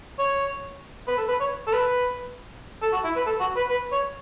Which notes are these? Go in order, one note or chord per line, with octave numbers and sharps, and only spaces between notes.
C#5
B4
A4
B4
C#5
A4
B4
A4
F#4
E4
B4
A4
F#4
B4
B4
C#5